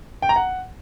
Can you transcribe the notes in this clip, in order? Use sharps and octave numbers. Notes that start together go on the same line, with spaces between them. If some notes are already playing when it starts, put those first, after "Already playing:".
G5
A#5
F#5